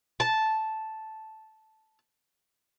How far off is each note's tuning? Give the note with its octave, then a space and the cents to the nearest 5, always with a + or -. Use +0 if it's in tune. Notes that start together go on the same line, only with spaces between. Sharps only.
A5 -5